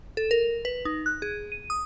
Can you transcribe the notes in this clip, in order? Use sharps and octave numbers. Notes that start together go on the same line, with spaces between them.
A4
A#4
B4
D#4
F#6
G#4
D#7
D#6